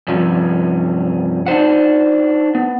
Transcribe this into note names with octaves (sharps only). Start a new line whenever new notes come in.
G2 C3 F3 C#4
D4 D#4 C5 F#5
B3